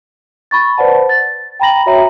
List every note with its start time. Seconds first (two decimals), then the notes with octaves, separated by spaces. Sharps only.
0.51 B5 C#6 A6
0.78 B4 C5 D5 F#5 A5
1.09 A6
1.60 G5 A#5 B5 A#6 F#7
1.86 F#4 C#5 E5 G5 A#5